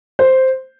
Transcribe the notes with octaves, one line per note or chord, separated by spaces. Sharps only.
C5